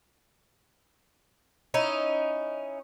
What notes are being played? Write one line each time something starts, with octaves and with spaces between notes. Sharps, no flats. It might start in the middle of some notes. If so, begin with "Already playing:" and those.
C#4 D#4 E4